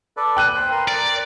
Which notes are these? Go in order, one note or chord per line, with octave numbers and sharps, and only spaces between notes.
A4 B4 D5
G5 F#6 D#7
B4 C5
A#4 C6
A#4 D5